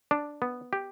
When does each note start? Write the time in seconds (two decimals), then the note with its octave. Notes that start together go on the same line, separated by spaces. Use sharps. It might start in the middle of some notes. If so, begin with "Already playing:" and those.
0.11 D4
0.42 B3
0.73 G4